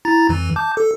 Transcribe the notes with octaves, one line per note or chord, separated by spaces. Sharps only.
E4 A#5 A6
F2 E3
A5 D6 G6
A4